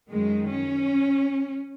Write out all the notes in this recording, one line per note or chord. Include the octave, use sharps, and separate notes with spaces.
F#2 D#3 G#3
C#4